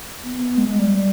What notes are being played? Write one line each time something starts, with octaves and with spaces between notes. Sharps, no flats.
B3
G#3
G#3
G3
G3